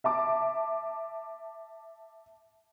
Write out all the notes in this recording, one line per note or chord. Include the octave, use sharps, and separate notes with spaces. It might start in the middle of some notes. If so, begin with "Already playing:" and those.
E5 A5 D6